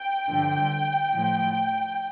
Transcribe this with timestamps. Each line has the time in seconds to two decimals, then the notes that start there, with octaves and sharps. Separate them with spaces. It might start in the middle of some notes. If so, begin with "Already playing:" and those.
Already playing: G5
0.28 G2 D3 F3
1.13 A2 F3